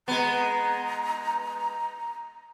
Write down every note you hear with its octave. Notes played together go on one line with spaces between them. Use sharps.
G#3 B3 A#5